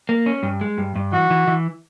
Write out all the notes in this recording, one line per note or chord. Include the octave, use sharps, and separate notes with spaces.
A#3
C#4
G2
G#3
G2
G2
E3 F#4
E3
E3